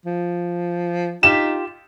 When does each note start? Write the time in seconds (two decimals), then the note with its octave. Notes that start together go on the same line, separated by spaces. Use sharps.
0.06 F3
1.23 D#4 F4 G4 E7